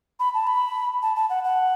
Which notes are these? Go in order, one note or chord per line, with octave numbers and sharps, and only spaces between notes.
B5
A5
B5
A5
A5
F#5
F#5